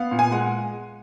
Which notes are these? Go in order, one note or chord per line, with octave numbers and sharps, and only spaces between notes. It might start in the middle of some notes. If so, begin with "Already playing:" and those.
Already playing: B3 F5
A#2
G#5
G#3 F#5